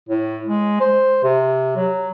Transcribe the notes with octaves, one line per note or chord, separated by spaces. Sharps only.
A2
G#3
C5
C3
F#3